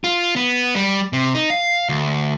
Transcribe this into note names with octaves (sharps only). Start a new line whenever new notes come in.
F4
B3
G3
C3
D#4
F5
D2